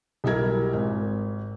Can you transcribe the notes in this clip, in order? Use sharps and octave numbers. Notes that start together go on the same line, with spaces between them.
B1 G3 E4 A#4 G#6
G#1